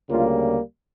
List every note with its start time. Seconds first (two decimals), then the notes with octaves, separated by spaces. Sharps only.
0.09 D2 C#3 G3 A#3 F4